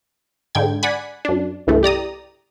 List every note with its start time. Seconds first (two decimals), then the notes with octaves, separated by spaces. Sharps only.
0.55 G#2 D3 G5 G#6
0.83 D5 F#5 G#5 B5
1.25 F#2 D4
1.67 C2 G2 C#3 E3 A3
1.83 G4 D5 A#5 D#6